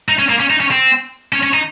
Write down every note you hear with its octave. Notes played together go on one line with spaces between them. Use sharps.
D#4
C#4
A#3
C#4
D#4
C#4
C4
C#4
C#4
D#4